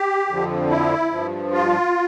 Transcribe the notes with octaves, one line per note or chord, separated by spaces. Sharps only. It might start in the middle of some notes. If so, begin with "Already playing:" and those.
Already playing: G4
F2 D3 F3
E4
G2 F3
F4